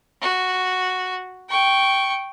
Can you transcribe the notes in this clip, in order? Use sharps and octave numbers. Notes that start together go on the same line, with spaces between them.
F#4
G5 C#6